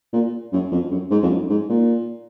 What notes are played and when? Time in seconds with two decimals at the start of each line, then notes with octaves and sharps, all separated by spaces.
0.13 A#2
0.53 F#2
0.72 F2
0.91 F#2
1.11 G#2
1.23 F2
1.30 F#2
1.50 G#2
1.70 A#2